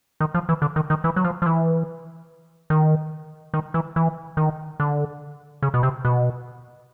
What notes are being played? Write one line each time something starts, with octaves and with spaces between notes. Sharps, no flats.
D#3
F3
E3
D3
D#3
D#3
E3
F#3
F3
F3
E3
D#3
D#3
E3
E3
D#3
D3
C#3
B2
C3
B2